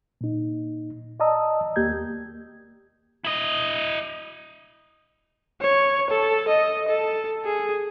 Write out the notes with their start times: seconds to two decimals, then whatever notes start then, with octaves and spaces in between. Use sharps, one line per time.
0.21 A#2 D#4
1.20 D5 D#5 A5 A#5 D#6 E6
1.76 D#2 A#3 G4 G6 G#6
3.24 E4 D#5
5.61 C#5
6.10 A4
6.48 D#5
6.89 A4
7.45 G#4